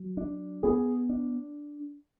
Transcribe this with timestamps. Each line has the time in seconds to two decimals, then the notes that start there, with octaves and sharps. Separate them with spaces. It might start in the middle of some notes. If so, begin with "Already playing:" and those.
Already playing: F#3
0.17 D4
0.63 B3 G#4
1.09 D4